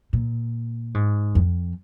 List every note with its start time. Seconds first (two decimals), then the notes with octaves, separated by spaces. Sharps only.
0.13 A#2
0.94 G#2
1.35 F2